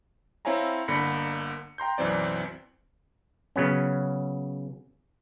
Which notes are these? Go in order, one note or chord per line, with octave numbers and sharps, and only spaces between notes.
C4 E4 C#5 F5 G#5 A#5
G1 D3 A#3 B5 A#6 C#7
G5 A#5 C6 G6
B1 F#2 E3 C4 D5
C#3 F#3 B3 C#4